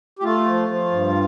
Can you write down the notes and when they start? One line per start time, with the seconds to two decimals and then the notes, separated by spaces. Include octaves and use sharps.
0.19 G4
0.23 A3 F4
0.46 F3
0.69 F3
0.91 G2